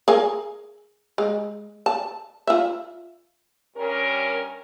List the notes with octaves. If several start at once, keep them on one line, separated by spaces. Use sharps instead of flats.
G#4 A#4 G#5
G#3
A5
F4 E5
G2 G3 C#4 A#4